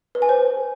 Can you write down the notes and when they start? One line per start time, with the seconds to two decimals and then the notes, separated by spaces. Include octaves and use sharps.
0.15 B4
0.22 G#5
0.29 C5